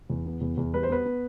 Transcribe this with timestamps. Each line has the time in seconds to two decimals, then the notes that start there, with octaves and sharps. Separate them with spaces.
0.10 E2
0.26 B3
0.41 E2
0.57 E2
0.73 G3 B4
0.83 C5
0.89 B3 B4
1.06 B3